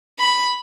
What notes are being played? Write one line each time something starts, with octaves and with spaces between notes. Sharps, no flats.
B5